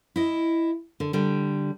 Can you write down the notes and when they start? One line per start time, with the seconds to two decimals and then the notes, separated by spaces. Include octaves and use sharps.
0.16 E4 D#5
1.00 D3
1.13 D3 G3